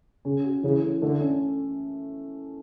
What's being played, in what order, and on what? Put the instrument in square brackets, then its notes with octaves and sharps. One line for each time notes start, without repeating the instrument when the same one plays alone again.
[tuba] C#3 [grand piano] C#4
[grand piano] F#4
[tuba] C#3 [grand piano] E3
[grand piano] A3
[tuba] D3 [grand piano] A3
[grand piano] C#4